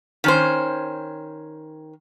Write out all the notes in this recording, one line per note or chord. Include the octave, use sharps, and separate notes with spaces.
D#3 C#4 C5